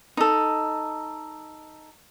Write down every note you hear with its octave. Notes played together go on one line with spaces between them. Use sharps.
D#4 A4